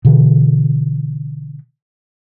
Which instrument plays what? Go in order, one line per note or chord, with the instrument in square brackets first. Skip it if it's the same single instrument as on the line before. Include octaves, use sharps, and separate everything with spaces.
[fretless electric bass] B2 D3 E3